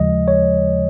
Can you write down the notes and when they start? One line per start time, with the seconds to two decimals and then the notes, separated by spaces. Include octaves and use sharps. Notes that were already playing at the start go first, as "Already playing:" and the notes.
Already playing: D#2 C#3 F3 G#3 D#5
0.28 C#5